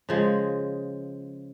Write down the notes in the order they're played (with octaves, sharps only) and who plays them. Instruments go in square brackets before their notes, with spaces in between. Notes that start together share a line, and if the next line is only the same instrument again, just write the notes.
[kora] C#3 F3 G#3